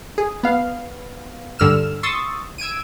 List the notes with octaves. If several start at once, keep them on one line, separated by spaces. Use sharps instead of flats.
G#4
B3 F5
G2 D3 E6 F6 E7
C6 C#6 D#6 E6 A6
E6 G#6 D7 D#7